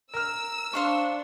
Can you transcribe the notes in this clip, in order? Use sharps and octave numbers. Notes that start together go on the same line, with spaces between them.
A#4 E6 F6
D4 C5 F5 C#6